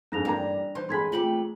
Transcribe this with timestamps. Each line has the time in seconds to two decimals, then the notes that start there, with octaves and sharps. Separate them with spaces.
0.12 F2 G#2 D4 A#6 F7
0.25 A1 G2 A#3 A#5
0.75 E3 C5 C6
0.89 A1 G#3 B5 C6 G#6 B6
1.12 A3 C4 F4 G4 F#7